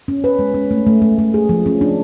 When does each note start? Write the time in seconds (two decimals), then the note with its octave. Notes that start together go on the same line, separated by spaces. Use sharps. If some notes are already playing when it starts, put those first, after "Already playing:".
0.08 C#4
0.24 B4
0.39 G#3
0.54 C#4
0.71 A3
0.87 A3
1.02 A3
1.19 A3
1.34 G#4
1.49 F3
1.66 C#4
1.81 D4